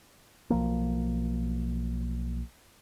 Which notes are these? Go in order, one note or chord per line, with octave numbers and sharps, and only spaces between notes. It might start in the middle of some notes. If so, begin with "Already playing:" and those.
B1 F3 A#3